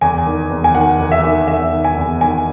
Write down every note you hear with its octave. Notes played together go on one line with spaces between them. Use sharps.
E2 G#5
D#3
E2
G#5
D#3 F#5
E2
E5
D#3
E2 E5
D#3
G#5
E2
D#3 G#5